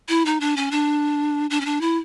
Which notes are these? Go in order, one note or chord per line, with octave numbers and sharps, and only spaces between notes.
E4
D#4
D4
C#4
D4
D4
C#4
D4
E4